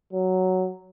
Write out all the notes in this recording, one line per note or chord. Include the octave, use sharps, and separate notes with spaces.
F#3